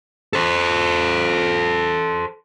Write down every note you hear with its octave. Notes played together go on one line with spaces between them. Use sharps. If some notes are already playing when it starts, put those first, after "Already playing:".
A4 C5